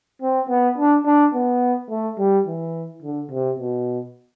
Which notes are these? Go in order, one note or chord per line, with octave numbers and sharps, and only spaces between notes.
C4
B3
D4
D4
B3
A3
G3
E3
D3
C3
B2